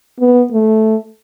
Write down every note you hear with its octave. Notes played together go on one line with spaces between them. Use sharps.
B3
A3